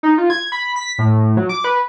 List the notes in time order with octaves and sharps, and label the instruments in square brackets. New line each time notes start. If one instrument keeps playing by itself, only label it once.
[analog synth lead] D#4
F4
G#6
B5
B6
A2
F#3
D6
B4